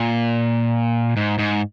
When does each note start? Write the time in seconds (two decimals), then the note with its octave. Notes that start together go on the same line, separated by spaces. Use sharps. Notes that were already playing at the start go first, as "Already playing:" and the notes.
Already playing: A#2
1.17 G#2
1.39 G#2